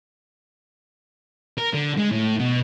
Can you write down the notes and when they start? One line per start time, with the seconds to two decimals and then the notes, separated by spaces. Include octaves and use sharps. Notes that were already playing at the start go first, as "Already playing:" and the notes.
1.58 A#4
1.73 D3
1.98 G#3
2.11 A2
2.40 B2